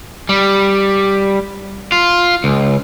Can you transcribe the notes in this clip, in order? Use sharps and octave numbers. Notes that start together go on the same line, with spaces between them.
G3
F4
C#2